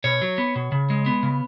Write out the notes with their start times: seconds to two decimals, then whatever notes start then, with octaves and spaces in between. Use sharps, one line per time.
0.04 B2 C#5
0.22 F#3
0.38 B3
0.55 B2
0.72 C#3
0.90 G#3
1.06 B3
1.23 C#3